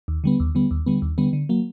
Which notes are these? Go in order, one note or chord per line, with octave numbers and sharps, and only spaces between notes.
D#2
D3 G3 B3
D#2
D3 G3 B3
D#2
D3 G3 B3
D#2
D3 G3 B3
D3
F#3 A#3